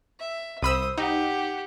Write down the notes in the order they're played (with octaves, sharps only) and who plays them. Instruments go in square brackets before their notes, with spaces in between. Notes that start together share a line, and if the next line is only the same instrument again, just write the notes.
[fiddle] E5
[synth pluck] C2 B5 E6 [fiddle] C5 D#6
[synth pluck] D#4 [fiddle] G4 F#5